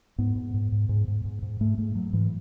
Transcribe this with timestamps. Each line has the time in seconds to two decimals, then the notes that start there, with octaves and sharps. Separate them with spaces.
0.18 G#2 B3
0.36 G#2
0.54 G#2
0.72 G#2
0.89 G#2
1.08 G#2
1.25 G#2
1.42 G#2
1.60 G#2 A3
1.78 G#2 A3
1.95 G#2 F#3
2.13 G#2 E3